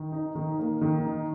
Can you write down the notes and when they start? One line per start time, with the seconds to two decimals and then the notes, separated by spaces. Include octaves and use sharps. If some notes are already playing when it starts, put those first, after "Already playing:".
Already playing: D#3
0.12 D#4
0.35 D#3
0.59 A#3
0.81 D#3
1.05 D#4